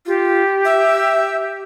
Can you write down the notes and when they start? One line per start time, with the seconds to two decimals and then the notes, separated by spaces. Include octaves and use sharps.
0.06 F4 G4
0.65 E5